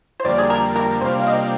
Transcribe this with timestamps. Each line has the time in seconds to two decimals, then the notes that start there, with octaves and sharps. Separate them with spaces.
0.20 C5
0.24 F2 D3 G3 A#3 D5
0.38 G#4
0.50 A#4
0.76 A#4
1.01 C3 G3 A#3 D4 F4 C5
1.20 F5
1.27 D#5